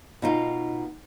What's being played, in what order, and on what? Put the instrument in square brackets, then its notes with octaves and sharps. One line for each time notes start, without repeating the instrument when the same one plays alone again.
[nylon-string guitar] B2 D#4 F4